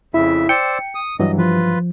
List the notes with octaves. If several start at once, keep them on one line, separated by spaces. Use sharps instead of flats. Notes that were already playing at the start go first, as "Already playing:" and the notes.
F2 C#3 E4 E5
C5 D5 G5 E6 C#7
D#6
G2 E3 F#3 D#5
F3 F4 B4